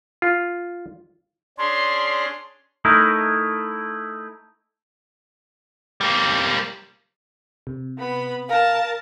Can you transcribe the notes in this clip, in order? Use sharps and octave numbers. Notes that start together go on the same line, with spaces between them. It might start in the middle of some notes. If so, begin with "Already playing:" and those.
F4
C#4 D4 G#4 C6
A3 D#4 E4 A#4
G3 A#3
C3
B3 B5
A#4 F5 A5